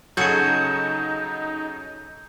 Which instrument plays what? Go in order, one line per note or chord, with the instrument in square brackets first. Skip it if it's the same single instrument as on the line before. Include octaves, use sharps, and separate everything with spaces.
[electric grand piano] C#3 F#3 [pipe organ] D#4 [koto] F#4 G#4 A4 [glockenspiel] G6 C#7